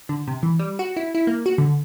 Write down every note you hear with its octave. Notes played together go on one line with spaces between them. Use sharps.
D3
C3
E3
G3
F#4
E4
E4
A#3
F#4
D3